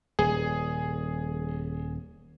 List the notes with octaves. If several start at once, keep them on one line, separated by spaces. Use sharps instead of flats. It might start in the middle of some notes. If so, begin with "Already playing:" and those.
D#1 G#4